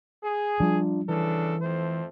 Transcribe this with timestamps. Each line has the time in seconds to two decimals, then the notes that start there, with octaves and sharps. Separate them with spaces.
0.24 G#4
0.60 F3 G3 D4 F4
1.09 C#3 E3 D4 A4
1.62 F2 A3 C5